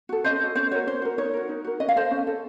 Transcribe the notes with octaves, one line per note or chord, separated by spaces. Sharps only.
F#4 A4
C#4 C5 D#5
F#4 A4
C#4 C5
F#4 A#4 C#5
C#4 C5
F#4 A#4
D#4 C#5
F#4 A#4
D#4
F#4 A#4
C#4 D#5
F5
A4 C5 D#5
C#4
A4